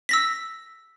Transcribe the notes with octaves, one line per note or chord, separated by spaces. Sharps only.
E6 A#6 B6